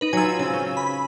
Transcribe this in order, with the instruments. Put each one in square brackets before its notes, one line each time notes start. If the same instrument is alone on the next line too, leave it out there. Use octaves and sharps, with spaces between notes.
[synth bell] D#4 B4
[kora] F#3 F4 [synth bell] G#5 E6
[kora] C#3 C4
C#4
[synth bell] B5